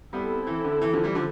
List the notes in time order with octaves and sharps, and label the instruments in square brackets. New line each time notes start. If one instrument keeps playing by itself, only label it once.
[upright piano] G3 B3 [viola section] C4 E4 A4
[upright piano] E3
D3
E3
D3 F3
E3 G3
D3 F3